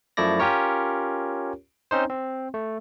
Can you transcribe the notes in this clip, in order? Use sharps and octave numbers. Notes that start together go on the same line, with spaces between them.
F#2 F3 A3 E4 D5 A#6
C#4 F4 G4 A#4 C#5
C4 C#4 D#4 C5
C4
A3